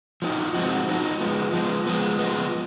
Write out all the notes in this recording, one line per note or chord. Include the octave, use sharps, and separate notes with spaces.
F3 G#3 C4 D#4 F#4
F3 G#3 C4 D#4 F#4
F3 G#3 C4 D#4 F#4
F3 G#3 B3
F3 G#3 B3
F3 G#3 B3
F3 G#3 B3